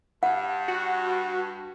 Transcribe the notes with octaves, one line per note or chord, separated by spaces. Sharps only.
G2 F#5
F#4